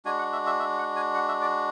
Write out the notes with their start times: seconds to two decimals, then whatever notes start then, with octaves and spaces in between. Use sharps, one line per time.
0.05 G#3 D4 F#4 G#5
0.19 F#5
0.33 E5
0.46 E5
0.59 E5
0.79 F#5
0.96 G#5
1.14 F#5
1.28 E5
1.42 D5